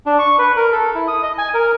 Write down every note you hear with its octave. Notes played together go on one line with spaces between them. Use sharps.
D4
C#6
B4
A#4
A4
E4
D#6
D#5
G#5
A#4